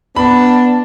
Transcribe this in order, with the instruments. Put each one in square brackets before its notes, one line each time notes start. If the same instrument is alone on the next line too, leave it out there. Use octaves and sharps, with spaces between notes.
[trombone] B3 [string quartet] D4 [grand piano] B5